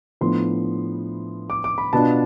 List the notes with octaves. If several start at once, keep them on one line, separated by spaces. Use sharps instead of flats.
A2 F3 B3 D4 C6
D6
D6
B5
B2 B3 D4 F4 A5